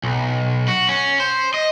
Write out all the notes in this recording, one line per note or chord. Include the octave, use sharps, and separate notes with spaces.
B1
F#4
C#4
C5
D#5